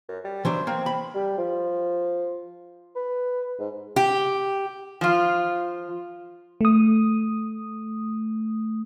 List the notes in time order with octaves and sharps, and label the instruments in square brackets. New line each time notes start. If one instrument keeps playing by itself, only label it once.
[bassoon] F#2
G3
[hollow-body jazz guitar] E3 F#3 D4 [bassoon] C5
[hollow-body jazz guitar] A#3 [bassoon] C4
[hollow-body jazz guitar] B5
[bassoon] G3
F3
B4
G#2
[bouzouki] G4
[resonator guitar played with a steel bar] F3 F4
[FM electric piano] A3 D#6